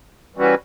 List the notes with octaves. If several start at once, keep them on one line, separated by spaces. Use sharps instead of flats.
E3 G3 C#4 F#4 B4